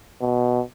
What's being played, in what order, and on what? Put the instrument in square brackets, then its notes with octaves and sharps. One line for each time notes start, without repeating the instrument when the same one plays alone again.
[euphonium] B2